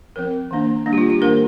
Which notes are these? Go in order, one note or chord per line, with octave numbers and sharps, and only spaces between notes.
F3 C4 A#4
D#3 A#3 D4
G3 A#3 D4
G4
F4
G4
D#3 A#3 D4 A#4